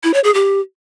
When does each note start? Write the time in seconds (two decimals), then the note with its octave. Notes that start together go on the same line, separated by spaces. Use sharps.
0.03 E4
0.14 C#5
0.24 G#4
0.34 G4